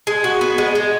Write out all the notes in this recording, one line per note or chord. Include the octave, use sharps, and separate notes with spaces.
G#3
F#4
B3
G#3
G#3